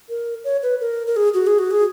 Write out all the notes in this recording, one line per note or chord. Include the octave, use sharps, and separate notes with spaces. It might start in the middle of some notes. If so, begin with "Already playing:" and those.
A#4
C#5
B4
A#4
A#4
G#4
F#4
G#4
F#4
G#4